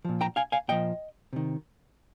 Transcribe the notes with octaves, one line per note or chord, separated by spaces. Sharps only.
A#2 F3
G5 A#5
F5 G#5
F5 G#5
A#2 F3 D#5 G5
C3 D#3